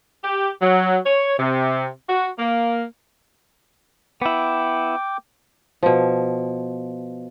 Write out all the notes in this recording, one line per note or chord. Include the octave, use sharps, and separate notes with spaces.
G4
F#3
C#5
C3
F#4
A#3
B3 E4 G5 D6
B2 F3